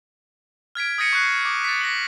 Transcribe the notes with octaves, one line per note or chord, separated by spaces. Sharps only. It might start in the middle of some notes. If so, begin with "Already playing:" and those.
F6 G#6 B6 D7
D#6 G6 G#6 A#6 C#7 D#7
C#6 F#6 C7
D6 D#7
A6 B6
A#6 C#7 F#7